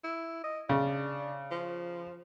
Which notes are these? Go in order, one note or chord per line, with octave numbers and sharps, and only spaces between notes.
E4
D#5
C#3 D4
F3